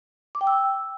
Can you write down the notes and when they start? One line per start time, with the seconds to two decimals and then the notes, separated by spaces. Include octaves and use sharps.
0.35 D6
0.41 G5
0.47 E6